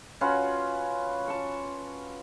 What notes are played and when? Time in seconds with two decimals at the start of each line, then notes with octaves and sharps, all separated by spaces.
0.21 C#4 F4 F#4 B4
1.28 A5 C#6